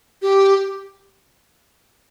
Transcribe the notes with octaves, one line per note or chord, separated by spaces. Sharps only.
G4